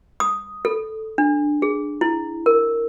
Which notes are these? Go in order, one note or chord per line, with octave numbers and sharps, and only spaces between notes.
D#6
A4
D4
G#4
E4
A#4